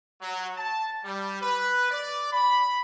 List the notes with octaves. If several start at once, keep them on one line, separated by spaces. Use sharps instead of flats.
F#3
A5
G3
B4
D5
B5